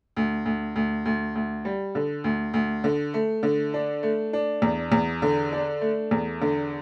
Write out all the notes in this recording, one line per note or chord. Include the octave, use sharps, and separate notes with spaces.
D2
D2
D2
D2
D2
G3
D3
D2
D2
D3
A3
D3
D4
A3
D4
E2
E2
D3
D4
A3
E2
D3